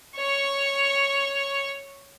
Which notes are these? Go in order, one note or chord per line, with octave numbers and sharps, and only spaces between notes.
C#5 C#6